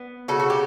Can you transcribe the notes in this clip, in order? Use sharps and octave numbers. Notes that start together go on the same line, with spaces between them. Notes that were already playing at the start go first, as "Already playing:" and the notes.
Already playing: B3
C#3 F#4 A4
F#4
G4